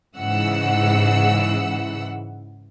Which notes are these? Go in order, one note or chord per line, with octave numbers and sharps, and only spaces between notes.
G#2 C#3 E3 F#5 E6